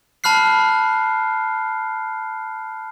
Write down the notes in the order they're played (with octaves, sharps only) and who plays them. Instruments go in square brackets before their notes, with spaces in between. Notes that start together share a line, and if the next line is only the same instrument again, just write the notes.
[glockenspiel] A5 B5 F6 F#6 C7